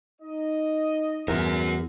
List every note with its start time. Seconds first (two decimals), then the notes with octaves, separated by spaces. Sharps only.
0.21 D#4 D#5
1.28 E2 F#4 A#4